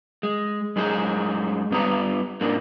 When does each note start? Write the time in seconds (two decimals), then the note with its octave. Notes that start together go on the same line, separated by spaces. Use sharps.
0.23 G#3
0.76 F#2 G#3 D#4 G#4
1.71 G2 B3 A#5
2.41 G#2 A#3 D4